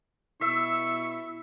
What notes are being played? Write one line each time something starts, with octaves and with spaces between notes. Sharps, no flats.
B2 E4 E5 C#6 E6